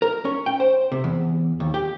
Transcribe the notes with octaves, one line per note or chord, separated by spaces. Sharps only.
A#4
C#4
G5
C5
C3
E2
D#2
G4